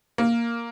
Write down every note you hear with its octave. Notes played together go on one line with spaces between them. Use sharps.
A#3